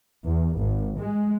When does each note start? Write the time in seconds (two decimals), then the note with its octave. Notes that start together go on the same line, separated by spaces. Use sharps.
0.24 E2
0.58 G#1
0.99 G#3